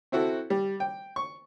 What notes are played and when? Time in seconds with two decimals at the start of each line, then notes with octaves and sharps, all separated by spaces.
0.12 C4 E4 F#4 A4
0.50 G3
0.80 G5
1.16 C#6